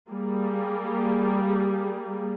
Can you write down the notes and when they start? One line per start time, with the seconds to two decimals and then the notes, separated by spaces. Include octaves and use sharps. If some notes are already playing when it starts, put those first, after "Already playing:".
0.11 G3 A#3 G#4